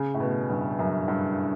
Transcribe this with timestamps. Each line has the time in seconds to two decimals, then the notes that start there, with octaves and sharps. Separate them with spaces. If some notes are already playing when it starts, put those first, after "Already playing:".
Already playing: C#3
0.14 A2
0.20 B2
0.50 G2
0.79 F#2
1.08 G2